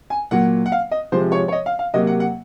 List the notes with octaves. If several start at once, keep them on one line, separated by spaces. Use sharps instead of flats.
G#5
A#2 F#3 A#3 F#5
F#5
F5
D#5
C3 F3 G#3 C5
C#5
C#5
D#5
F5
F5
C3 F#3 A#3 D#5
F#5
F#5